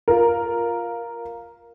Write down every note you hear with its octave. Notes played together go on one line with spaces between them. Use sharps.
F4 A#4